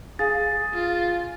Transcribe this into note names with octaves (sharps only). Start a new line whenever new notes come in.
G#4 F5 A6
F4